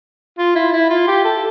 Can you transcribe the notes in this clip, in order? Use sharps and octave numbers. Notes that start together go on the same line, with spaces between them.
F4
E4
E4
F4
G4
A4